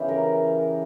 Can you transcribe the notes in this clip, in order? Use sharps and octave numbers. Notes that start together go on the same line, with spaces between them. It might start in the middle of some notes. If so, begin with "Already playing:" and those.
Already playing: C#3 E3 G4
A#4